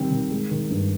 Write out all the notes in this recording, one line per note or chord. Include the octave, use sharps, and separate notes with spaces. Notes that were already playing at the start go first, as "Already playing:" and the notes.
Already playing: D#3 G3 C4
D#3
G#3
D#3
G2